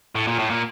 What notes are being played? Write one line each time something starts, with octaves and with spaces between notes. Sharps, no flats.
A2
A#2
A2
A#2